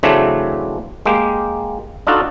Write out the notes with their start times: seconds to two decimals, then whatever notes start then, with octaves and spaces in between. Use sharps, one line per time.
0.03 C#3 E3 F#3 A3 C4 D4
1.06 G#3 A#3 G4
2.07 D4 D#4 F4 F#4 A4